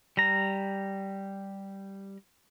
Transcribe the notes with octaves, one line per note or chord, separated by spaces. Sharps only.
G3 A#5